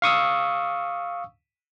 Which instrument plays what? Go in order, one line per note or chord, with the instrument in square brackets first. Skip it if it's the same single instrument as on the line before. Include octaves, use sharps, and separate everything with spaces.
[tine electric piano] F5 C#6 D#6 E6